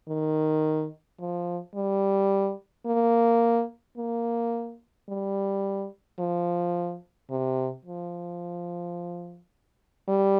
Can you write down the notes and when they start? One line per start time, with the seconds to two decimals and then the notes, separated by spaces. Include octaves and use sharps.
0.08 D#3
1.20 F3
1.75 G3
2.86 A#3
3.98 A#3
5.09 G3
6.19 F3
7.30 C3
7.85 F3
10.08 G3